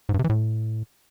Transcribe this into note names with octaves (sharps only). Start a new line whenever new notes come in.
G#2
G2
C3
E3
A2